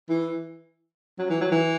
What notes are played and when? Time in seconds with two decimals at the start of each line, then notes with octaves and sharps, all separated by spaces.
0.09 E3
1.18 F#3
1.30 E3
1.41 F#3
1.51 E3